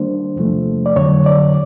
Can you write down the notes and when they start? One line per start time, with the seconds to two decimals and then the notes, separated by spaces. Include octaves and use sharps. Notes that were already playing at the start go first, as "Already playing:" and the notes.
Already playing: D#3 G3 A#3 D4 C5
0.36 E2 C3 F3 A3
0.86 D5
0.96 F2 D3 F#3 C#5
1.26 D5